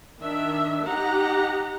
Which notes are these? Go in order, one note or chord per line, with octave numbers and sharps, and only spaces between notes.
D#3 D4 E5
D#4 G4 F#5 A#5